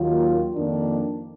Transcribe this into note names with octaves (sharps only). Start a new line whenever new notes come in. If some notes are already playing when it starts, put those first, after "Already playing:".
Already playing: D#2 D#3 F#3 A#3 F4
F2 D#3 A#3 D4